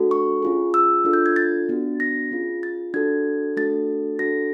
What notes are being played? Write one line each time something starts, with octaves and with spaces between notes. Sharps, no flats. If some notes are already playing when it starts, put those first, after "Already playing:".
Already playing: A3 D4 F#4 A4
C#6
C#4 F4 G#4
E6
D4 F4 A4
G6
G#6
A6
B3 D4 F#4
A#6
C#4 F4 G#4
A6
D4 F#4 A4 G#6
A3 D4 F#4 A4 A6
D4 F#4 A4 A#6